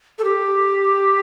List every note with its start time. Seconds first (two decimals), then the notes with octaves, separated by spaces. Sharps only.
0.19 A4
0.24 G4